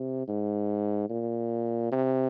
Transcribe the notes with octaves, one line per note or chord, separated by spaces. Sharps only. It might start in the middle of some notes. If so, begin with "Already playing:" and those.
Already playing: C3
G#2
A#2
C3